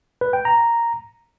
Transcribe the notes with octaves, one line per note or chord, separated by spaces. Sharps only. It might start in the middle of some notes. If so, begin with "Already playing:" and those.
B4
G5
A#5